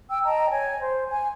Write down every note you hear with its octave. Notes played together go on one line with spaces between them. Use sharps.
G5 E6
D#5 G5 A5 A#5
C#5 G#5
C5
G#5